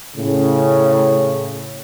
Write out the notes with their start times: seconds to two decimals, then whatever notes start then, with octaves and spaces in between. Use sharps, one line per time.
0.16 A2 C#3